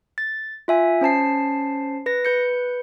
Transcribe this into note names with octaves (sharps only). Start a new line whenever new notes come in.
A6
F4 E5 G#5
C#4 C5 A5 C7
B4 A#6
B4 G6 C#7